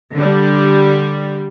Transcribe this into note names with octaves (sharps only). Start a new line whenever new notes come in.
D3 G3